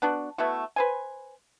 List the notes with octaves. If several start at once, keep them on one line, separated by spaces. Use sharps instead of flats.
B3 D4 F#4
A3 B3 E4 F#4
B4 C5 G#5